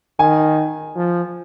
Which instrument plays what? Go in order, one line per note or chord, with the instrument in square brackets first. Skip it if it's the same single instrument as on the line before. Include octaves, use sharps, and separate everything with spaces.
[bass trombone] D#3 [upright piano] G#5
[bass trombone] F3